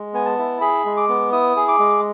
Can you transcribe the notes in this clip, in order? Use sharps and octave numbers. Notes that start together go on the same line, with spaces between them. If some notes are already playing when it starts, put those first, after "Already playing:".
Already playing: G#3
B3 G#5
A5
E4
G#4 B5
G#3
D6
B3
E4 D#6
G#4
D6
G#3